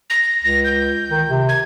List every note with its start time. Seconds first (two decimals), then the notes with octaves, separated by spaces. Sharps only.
0.10 A#6
0.44 C#2 A#6
0.65 G6
1.10 D#3
1.29 C3
1.49 G#6